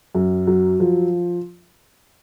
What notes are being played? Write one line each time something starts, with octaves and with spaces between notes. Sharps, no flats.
F#2
F#3
F3